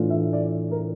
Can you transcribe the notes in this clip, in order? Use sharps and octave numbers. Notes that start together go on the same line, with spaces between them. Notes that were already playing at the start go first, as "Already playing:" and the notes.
Already playing: A2 E3 A3 D4 F4
E5
D5
A#4